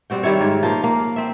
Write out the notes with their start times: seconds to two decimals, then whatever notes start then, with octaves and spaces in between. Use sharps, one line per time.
0.10 G3 C4 F#4 G5
0.23 D#3 G3 E4 C#5
0.41 G#2
0.63 F3 A#3
0.84 A#3
1.16 C4 E5